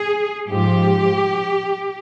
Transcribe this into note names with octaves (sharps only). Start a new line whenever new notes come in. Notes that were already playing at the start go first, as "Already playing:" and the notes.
Already playing: G#4
G#2 F3 G4